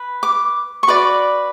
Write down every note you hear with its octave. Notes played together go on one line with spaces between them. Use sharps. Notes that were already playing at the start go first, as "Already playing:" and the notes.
Already playing: B4
D6
C#6
F#4 B4 D5 D6